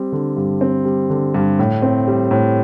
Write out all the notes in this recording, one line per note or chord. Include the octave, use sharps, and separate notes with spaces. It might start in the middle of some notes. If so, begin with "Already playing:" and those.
Already playing: G3 C4
D3
G2
C4
G3
D3
G2
A2
C4
G3
A2